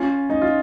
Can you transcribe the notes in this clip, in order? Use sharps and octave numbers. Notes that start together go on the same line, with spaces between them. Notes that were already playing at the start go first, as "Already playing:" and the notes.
Already playing: C#4 F4
D#4
F4